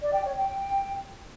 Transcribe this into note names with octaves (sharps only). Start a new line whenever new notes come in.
D5
G5
C#5
G5